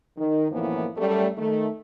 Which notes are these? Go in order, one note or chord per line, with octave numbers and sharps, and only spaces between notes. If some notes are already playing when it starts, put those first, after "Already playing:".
D#3
F#2 A2 E3 F3 A#3 B3
F#2 G3 A3
D#3 A3